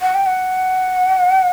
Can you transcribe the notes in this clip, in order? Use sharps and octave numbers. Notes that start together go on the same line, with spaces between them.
F#5
G5
F#5